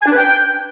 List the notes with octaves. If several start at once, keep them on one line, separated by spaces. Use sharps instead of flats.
G#5
D4
B4
G5